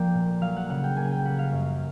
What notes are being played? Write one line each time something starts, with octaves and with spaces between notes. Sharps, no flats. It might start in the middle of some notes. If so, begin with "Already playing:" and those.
Already playing: F3 A#3 D5 G5
A#2
F#3 F5
F#5
C#3 F#5
G5
A#3 G#5
G5
G3 F#5
F5
F#2